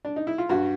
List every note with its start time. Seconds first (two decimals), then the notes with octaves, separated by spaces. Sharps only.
0.05 D4
0.16 D#4
0.27 E4
0.38 F4
0.49 G2 F#4